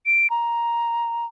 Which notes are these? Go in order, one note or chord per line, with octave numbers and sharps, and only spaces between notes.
D7
A#5